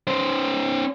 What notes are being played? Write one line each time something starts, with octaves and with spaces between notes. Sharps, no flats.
C#4 C5